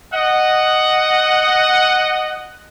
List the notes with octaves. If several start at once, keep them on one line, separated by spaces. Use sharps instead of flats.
D#5 F#5